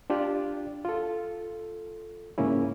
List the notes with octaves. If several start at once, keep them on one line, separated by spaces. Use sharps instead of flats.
D4 F4 G4 D5
F4 A4
G#2 C#3 A#3 C#4 E4